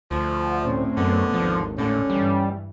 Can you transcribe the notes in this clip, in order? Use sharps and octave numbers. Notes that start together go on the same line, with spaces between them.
D2 F3
A2 C4 C#4
F#2 D3 B3
G#1 D#2 F3
A2 D3 C#4
G2 E3 G3